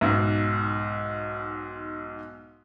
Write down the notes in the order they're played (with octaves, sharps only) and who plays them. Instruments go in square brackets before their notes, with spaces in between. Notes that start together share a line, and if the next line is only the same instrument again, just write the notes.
[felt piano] B1 G#2